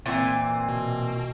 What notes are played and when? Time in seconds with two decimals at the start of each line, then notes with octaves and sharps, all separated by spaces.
0.06 A#2 E3 C4
0.69 B2